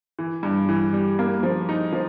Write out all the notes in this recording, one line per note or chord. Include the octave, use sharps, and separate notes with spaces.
E3
G2
E3
G3
A#3
F3
D#4
F3